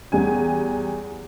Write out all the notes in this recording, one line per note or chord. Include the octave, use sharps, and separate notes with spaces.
E2 G3 G#5